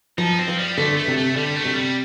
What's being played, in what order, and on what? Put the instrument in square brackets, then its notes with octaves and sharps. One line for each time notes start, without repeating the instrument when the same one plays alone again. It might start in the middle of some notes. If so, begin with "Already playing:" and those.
[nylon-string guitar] F3 [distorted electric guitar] D#4
[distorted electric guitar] C4
[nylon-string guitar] F3
[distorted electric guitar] G3
[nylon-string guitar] D3 [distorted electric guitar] A3
[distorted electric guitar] A3
[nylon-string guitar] C3
[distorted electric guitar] A3
[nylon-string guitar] D3 [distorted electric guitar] G3
[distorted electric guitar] A3
[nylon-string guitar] C3
[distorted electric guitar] G3